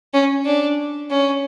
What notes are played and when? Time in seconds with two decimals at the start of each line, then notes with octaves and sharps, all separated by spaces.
0.14 C#4
0.45 D4
1.10 C#4